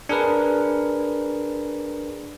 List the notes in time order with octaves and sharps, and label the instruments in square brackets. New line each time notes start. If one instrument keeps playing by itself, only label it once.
[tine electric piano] D4 G#4 A#4 B4